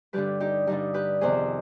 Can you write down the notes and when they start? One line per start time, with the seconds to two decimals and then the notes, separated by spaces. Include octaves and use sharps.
0.13 G2 D3 G3 G4 B4
0.40 D#4 G4
0.67 G2 D3 G3 D#4
0.94 G4 B4
1.21 F2 C3 D#3 B3 G#4 C5